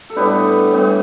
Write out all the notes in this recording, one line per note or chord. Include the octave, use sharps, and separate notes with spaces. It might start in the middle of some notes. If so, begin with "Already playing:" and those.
A4
A2 G3 B3 D4 G4 B4
A2 E3 G3 B3